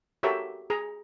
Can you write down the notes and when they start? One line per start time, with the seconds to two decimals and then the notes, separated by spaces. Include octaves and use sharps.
0.23 F#4 G4 A4 A#4 C#5 E5
0.70 G#4 A#5